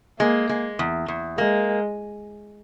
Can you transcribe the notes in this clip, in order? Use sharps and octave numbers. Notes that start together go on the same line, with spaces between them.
G#3 A#3
G#3
E2
E2
G#3 A#3